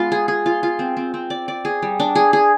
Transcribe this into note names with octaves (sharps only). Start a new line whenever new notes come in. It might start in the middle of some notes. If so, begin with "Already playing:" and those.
Already playing: G#3 B3 F4
G#4
G#4
F4
F4
C4
C4
C4
D5
D5
G#4
G3
D4
G#4
G#4